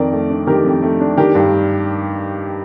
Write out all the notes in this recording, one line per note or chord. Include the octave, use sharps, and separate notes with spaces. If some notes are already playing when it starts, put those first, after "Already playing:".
Already playing: F2 D#3 A#4 D5
A3
D4
D#3 G4 A#4
F2
A3
D4
D#3 G4 A#4
G2